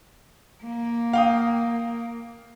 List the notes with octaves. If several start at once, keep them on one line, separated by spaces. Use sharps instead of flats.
A#3
F5 G5 D#6